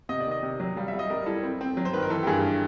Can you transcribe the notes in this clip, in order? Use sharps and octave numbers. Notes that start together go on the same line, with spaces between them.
C3 D#5
D5
D#3 D#5
C3
F#3
G3 F5
E5
G3
D#5
G3 A#4
E4 A4
C4
C4
F#3
C5
D#3 B4
A#4
E3 A4
G4
G2 G#4